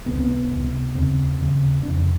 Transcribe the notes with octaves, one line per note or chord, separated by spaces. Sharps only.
C#2 C3 B3
C4
B3
C#2 C3
D#2 C#3 C4
D#2 C#3
F2 C3 D4